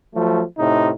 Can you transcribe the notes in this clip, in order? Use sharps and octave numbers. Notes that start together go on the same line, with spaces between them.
F3 F#3 A3
A2 C3 D#4